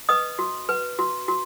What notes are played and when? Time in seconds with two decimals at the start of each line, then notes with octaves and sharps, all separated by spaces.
0.09 B4 D#5 D#6
0.39 F#4
0.69 B4
0.99 F#4
1.28 F#4